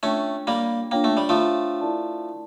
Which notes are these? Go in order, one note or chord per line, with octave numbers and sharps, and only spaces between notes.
A3 C#4 D4 F4 C#5 G5
G3 A#3
A#3 D4 F4 C#5 G5
A3
G3
F3 A3
E4 A#4 D5 A5